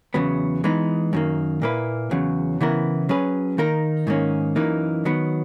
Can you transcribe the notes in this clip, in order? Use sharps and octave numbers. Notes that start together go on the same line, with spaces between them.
E2 C#3 F#3 B3
E3 G#3 B3 D#4
F#2 D#3 A#3
A#2 A#3 E4 B4
E2 C#3 F#3
C#3 E3 B3 E4 A#4
F#3 C#4 G#4 B4
D#3 A#3 D#4 A#4
G#2 D#3 A#3 C#4
F#2 E3 A#3 D#4
D#3 F#3 B3